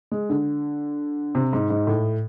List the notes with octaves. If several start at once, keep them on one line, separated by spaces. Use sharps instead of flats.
G#3
D3
C3
G#2
G#2
A2